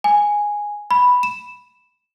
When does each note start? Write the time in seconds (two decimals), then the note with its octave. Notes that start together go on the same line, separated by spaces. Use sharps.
0.04 G#5
0.91 B5
1.23 E7